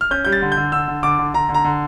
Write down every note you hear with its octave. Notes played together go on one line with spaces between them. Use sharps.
F6
C#4 G6
G3 G6
A6
D3
G6
D3
D3 E6
D3
D3 D6
D3
D3 A#5
D3
A#5
D3